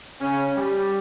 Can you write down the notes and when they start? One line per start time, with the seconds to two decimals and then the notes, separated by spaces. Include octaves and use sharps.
0.19 C#3 C#4
0.56 G3